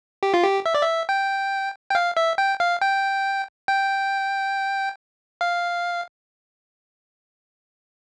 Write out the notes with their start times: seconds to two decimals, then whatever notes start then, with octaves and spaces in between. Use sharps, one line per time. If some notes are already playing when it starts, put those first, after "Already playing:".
0.23 G4
0.34 F4
0.43 G4
0.66 E5
0.74 D5
0.83 E5
1.09 G5
1.90 G5
1.95 F5
2.17 E5
2.38 G5
2.60 F5
2.81 G5
3.68 G5
5.41 F5